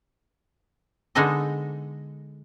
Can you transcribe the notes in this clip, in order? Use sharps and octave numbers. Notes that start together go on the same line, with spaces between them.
D3 G#3 B3 D#4 A4 D#5